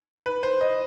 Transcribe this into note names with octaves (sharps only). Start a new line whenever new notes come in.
B4
C5
D#5